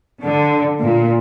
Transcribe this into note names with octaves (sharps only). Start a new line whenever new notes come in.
D3
A#2